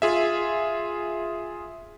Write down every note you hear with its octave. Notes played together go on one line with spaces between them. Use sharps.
F4 G#4 E5